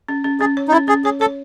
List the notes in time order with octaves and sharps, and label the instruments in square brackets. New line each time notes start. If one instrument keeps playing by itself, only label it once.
[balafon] C#4
C#4
[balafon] C#4 [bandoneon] G#4
[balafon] C#5
[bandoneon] D#4
[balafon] C#4 [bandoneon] E4
[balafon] C#4 [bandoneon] G#4
[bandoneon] G#4 [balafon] C#5
[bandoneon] A4 [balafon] C#5